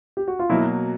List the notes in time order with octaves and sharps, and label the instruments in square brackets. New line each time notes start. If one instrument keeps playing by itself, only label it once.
[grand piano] G4
F#4
F4
[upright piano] B2 F#3 A#3 [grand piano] E4